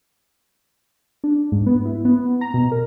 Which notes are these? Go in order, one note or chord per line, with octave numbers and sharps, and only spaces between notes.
D4
G#2
B3
E4
B3
A#5
B2
A#4